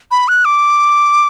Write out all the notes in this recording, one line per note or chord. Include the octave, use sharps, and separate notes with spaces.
B5
F#6
D6